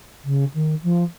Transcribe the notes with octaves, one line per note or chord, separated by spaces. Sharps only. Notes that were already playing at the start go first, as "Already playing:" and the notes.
C#3
D#3
F3